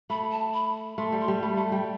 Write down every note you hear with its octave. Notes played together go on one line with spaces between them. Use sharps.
A3 B5
A5
B5
A3 C6
G3
C6
G3
A3 B5
A3 A5
G3 G5